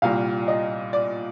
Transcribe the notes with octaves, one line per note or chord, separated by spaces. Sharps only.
C2 A#2 G3 F5
D#5
D5